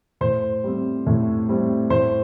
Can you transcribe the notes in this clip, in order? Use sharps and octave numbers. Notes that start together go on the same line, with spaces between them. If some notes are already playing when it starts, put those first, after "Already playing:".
A2 C5
G3 C4
A2
G3 C4
A2 C5